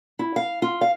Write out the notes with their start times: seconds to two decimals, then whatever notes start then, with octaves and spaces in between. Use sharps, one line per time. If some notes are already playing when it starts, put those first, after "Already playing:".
0.19 E4
0.36 F5
0.62 F4
0.81 F5